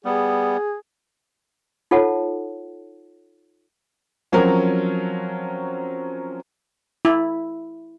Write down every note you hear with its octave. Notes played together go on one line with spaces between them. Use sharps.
G3 B3 G#4
D#4 F4 A4 C#5 F#5 A5
F3 F#3 C4 C#4 F#4 A#4
E4